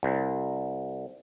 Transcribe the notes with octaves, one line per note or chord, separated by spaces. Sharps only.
C2